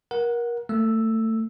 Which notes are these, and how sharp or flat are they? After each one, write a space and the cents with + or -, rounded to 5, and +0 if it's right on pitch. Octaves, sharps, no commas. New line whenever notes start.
A#4 +25 F#5 -5
A3 +25 E6 +0